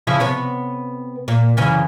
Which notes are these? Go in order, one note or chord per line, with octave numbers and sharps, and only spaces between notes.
C#3 F3 E4
C3 B3 C#5
A#2
F#2 C#3 E3